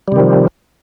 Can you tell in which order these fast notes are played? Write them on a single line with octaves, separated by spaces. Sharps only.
G3 C3 D#3 F3